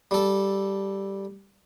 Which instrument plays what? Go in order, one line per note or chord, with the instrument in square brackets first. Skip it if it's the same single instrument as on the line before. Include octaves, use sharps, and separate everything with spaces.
[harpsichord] G3 A4